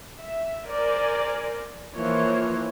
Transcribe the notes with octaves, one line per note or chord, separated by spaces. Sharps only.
E5
A#4 C5 D5 G#5
E3 F3 A#3 C5 C#5